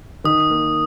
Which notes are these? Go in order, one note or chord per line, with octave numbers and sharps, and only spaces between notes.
D#3 D#6
A#3